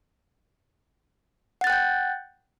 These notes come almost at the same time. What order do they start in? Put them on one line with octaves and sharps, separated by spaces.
F#5 A6 F#6 G5 G6